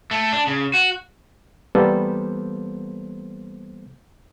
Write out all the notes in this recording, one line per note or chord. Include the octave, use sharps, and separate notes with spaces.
A3
D4
C#3
F#4
E3 G3 A#3 B3 A4 C5